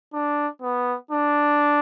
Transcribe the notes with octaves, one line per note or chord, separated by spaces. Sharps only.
D4
B3
D4